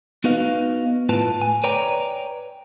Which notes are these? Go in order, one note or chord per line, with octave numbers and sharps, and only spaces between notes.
B3 D#4 F#4 B4 D#5 F5
A2 F4 B4 A5
G#5
B4 C#5 D5 G5 A#5